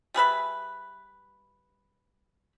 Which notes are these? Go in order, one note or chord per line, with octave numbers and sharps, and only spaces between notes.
G3 G#4 B4 E5